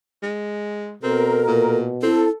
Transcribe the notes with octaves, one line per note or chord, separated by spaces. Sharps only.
G#3
B2 C4 A4 A#4
A#2
C4 E4 A4